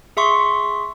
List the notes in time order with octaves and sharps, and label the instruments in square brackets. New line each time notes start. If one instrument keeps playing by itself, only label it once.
[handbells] G#4 E5 C6 C#6